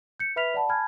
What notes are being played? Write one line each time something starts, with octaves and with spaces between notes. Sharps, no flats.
G6 C#7
B4 E5 B5 F6 B6 F7
D5 F#5 A5 B5
G#5 A5 B5 F6 G#6